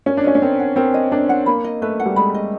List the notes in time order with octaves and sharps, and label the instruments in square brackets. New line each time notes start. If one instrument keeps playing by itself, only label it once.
[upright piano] C#4 [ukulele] A#4
[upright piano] D4
[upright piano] C#4 [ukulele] D#5
[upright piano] C#4
[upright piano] C4 [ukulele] A#4
[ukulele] F#5
[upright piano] C4 [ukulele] A#4
[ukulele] D#5
[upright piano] D4 [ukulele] A#4
[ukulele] F#5
[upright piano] A#3 [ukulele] B5
[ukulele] D#5
[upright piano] A3 [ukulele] B4
[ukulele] F#5
[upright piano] G3
[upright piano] G#3 [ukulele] B5
[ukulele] D#5